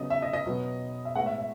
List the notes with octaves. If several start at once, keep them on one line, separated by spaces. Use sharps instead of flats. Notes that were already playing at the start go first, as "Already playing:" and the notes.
Already playing: C#3 F#3 B3 D#5
E5
D#5
D#5
B2 F#3 B3
E5
A2 G#3 B3 F#5
E5
E5